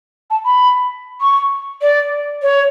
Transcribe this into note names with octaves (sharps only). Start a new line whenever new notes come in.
A5
B5
C#6
D5
C#5